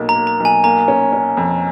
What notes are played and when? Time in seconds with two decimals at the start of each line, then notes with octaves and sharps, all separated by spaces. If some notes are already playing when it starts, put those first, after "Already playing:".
Already playing: B1 F#3 A#3
0.09 A#5
0.15 A#3
0.27 A#5
0.40 B1
0.45 G#5
0.64 A#3 A#5
0.88 C#4
1.13 C#4
1.37 F2